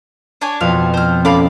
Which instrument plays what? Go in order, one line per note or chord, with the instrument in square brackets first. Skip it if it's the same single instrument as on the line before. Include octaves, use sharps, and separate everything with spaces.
[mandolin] D4 C#5 G#5
[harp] F2 B2 [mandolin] F5
[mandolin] C5 F6
[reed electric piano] C#4 A4 [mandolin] F5 B5 D6